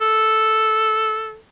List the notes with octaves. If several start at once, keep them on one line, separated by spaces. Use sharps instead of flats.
A4